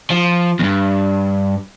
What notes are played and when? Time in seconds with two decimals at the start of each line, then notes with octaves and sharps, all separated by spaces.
0.10 F3
0.59 E2 G2